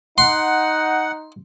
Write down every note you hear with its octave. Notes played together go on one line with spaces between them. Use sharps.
D#4 F#5 C6